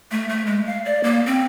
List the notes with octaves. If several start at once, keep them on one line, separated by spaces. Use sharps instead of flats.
A3
A3
G#3
F5
D5
A#3
C4